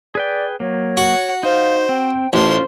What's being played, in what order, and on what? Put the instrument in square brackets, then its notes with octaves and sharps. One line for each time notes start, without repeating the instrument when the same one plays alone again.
[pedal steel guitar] G#4 B4 G5 [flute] D5
[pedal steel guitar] F#3 A#3 [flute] C#5
[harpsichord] F#4 [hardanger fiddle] F#5
[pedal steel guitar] D#4 [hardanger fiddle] C5 [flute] F5
[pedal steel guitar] C4 [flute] G5
[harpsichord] A1 [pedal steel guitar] C#4 F4 [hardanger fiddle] C5 C6 [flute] A5